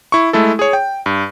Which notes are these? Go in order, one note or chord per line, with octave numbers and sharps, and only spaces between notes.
E4 C#6
G#3 A3 E4 A4
G#4 C#5
G5
G2